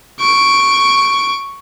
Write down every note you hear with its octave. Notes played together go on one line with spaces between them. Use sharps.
C#6 D7